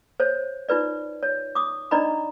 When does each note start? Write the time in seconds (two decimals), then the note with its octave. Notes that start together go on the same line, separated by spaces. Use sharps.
0.20 C5 C#5
0.69 D#4 F4 B4 D5
1.23 C#5
1.55 D6 D#6
1.91 D4 D#4 D5 D#5 A#5 B5